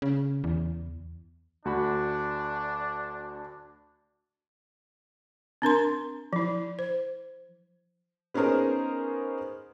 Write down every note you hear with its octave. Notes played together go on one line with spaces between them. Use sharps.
C#3
E2
D2 D4 F#4 B5
C4 D4 A#4 C6
F3 E4
C5
B3 C#4 D#4 G#4 A#4 C5